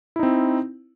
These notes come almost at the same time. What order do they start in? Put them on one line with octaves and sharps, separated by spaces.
E4 D#4 C4